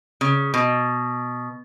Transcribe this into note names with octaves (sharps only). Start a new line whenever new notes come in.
C#3
B2